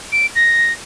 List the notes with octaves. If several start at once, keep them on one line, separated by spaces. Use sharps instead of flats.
D7
A#6